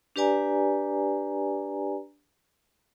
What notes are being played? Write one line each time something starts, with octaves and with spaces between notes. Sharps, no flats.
D4 G4 B4 D5 G#5 A#5